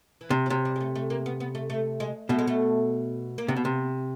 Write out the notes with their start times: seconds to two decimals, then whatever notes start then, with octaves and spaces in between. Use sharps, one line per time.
0.21 E3
0.30 C3
0.46 F3
0.50 C3 F#3
0.65 G3
0.76 G#3
0.80 A3
0.95 A3
1.10 A#3
1.26 B3
1.40 B3
1.55 A3
1.70 A3
2.00 G#3
2.29 B2 A3
2.39 G#3
2.47 A3
3.38 A#3
3.48 C3 B3
3.56 B2
3.65 C3